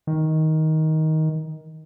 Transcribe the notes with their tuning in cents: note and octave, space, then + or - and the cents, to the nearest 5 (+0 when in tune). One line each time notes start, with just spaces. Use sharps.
D#3 +15